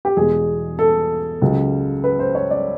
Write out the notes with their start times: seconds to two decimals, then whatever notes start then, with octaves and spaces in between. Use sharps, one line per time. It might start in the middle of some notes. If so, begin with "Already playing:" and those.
0.05 G4
0.17 E2 B2 G#3 G#4
0.79 A4
1.41 C#2 C#3 F#3
2.04 B4
2.19 C5
2.35 C#5
2.51 D5